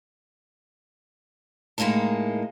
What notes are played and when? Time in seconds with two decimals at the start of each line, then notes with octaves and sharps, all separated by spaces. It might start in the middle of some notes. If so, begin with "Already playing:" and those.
1.78 A2 G#3 A#3 D#4 A5